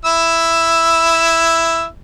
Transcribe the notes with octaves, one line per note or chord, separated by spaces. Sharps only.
E4 E6